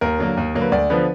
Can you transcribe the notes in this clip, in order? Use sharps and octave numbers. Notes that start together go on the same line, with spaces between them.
D#2 A#4
D3 F#3 A#3
D#2
D3 F#3 A#3
B4
D2 D5
D3 F3 B3 B4